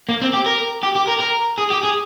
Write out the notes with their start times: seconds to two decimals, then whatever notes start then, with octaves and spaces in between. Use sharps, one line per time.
0.09 A#3
0.22 C4
0.34 G4
0.46 A#4
0.83 G4
0.96 G4
1.08 A#4
1.20 A#4
1.58 G#4
1.70 G4
1.83 G#4